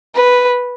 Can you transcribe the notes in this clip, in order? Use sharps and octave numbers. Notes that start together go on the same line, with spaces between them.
B4